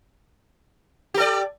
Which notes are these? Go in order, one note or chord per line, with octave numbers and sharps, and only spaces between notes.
G4 A4 D5